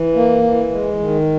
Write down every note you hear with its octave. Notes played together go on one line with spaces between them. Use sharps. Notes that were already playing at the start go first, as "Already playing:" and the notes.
Already playing: E3
A#3
E3
G#3
D#3